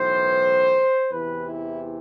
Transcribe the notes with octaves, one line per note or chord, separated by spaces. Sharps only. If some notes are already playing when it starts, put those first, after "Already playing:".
Already playing: B1 A2 E3 C5
E2 C3 E3 B4
E4